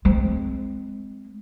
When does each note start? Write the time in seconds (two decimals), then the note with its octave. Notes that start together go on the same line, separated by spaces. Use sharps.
0.05 G#3 C4